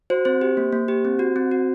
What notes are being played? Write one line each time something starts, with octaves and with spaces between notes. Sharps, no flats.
F#4 C5
C4 C5
G4
A#3
A#3
G4
C4
F#4
C4
F#4